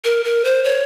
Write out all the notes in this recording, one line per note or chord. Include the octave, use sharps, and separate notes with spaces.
A#4
A#4
C5
C#5